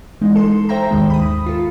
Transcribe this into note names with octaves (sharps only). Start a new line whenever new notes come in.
E3 G#3 D#4
A4 C6
C5 E5 G5 A#5
G#1 D#2 D#3 G#3
B5 D#6
F4 A4